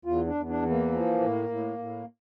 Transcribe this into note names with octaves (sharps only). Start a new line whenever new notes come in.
E2 F4
D4
E2
D4
E3
A#3
F3
A2
A2
A2